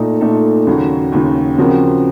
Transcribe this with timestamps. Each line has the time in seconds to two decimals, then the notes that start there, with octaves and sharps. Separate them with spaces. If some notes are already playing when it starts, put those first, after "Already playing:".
Already playing: A#2 A3 D#4 A4
0.21 A#2 A3 D#4 A4
0.67 D#2 C#3 F#3
1.12 D#2 C#3 F#3
1.58 C#3 F3 C4 F#4 A#4